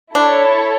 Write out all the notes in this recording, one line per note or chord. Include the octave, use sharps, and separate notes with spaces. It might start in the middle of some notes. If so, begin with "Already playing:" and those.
D4 E4 A4 C#5